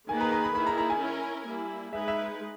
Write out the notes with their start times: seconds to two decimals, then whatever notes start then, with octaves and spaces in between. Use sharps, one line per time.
0.09 D#3 A#3 D#4 G#4 B4 G#5
0.21 A#5
0.32 A#5
0.44 B5
0.55 D#3 A#3 E4 G#4 B5
0.67 A#5
0.78 A#5
0.90 G#5
1.00 C#4 E4 A#4
1.46 G3 A#3 E4
1.93 G#3 D#4 G#4 B4 E5
2.08 E5